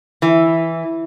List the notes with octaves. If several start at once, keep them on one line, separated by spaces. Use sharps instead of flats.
E3